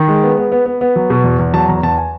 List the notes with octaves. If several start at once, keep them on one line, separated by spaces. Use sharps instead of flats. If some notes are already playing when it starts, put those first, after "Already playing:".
Already playing: D#3
G#3
B3
B3
B3
B3
B3
F#3
B2
E2
E2
F#3 A5
E2 A#5
E2 A5
G#5